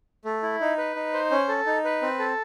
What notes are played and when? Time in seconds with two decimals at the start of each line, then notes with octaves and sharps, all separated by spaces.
0.25 A3
0.43 E4
0.61 D#4
0.78 B4
0.96 D#4
1.13 C5
1.31 C#4
1.48 A4
1.66 D#4
1.84 B4
2.02 C4
2.19 A4